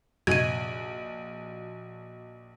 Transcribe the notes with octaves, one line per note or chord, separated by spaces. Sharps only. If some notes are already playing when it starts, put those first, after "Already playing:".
A#1 F#2 C3 F#4 D#5 G#6 D#7